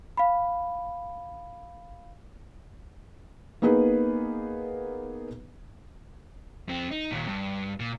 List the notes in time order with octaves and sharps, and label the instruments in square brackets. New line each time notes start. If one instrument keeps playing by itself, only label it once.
[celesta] F5 B5
[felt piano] A#3 B3 D#4 G#4 B4
[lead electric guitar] F2 C4
D#4
D#2 A#2
G2
A#2